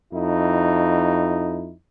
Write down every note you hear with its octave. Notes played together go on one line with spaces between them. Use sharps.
F2 D#4 E4